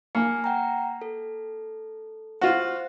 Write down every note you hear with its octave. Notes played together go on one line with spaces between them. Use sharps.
A#3 G#5 C#7
F#5 G5 A#5
A4
F4 F#4 C5